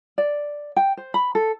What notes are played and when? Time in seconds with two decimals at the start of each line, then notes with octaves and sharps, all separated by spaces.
0.18 D5
0.76 G5
0.97 C5
1.14 B5
1.35 A4